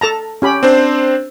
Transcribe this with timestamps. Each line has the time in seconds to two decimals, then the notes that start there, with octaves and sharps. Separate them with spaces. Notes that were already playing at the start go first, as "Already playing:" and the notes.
0.01 A4 A5 A#5
0.42 C#4 G4 B5
0.63 C4 D4 C5